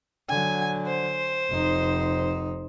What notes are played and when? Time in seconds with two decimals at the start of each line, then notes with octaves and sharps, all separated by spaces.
0.29 D3 F#3 G#5
0.87 C5
1.50 F1 D#4